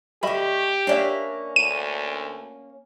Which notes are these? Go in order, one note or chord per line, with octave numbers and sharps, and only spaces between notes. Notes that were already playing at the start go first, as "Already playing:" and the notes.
D3 A3 G4 D#5 E5 B5
A#3 C#4 D4 D5 E5
D2 D#7